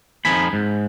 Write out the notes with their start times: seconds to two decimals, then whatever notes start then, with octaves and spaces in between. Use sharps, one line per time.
0.25 F2 F3 D#4 G#5 B5
0.53 G#2